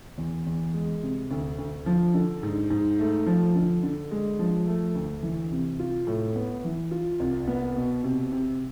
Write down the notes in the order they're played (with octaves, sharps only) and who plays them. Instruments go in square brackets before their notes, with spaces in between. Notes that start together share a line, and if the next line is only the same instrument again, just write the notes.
[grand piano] E2
E2
G#3
C3
D2
D2
F3
D3
G#2
G#2
A3
F3
D3
D3
G#3
F3
A3
D2
E3
C3
F4
A2
B3
E3
F4
C2
B3
B2
C3
C3